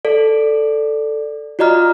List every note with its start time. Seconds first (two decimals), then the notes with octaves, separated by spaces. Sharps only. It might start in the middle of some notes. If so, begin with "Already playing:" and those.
0.05 A4 D5
1.59 F4 F#4 D5 D#5 A#5 F6